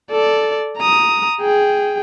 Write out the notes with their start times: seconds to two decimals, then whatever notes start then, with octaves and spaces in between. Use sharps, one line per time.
0.11 A4 D5
0.77 A#5 D#6
1.41 G#4 G5